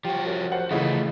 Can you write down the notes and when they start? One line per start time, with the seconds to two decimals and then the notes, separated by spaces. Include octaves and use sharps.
0.05 F3 F#4 G4
0.26 F#2
0.52 C5 F#5
0.71 C#3 E3 F3 A3 D#4